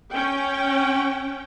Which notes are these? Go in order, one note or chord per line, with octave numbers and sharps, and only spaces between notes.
C#4 G5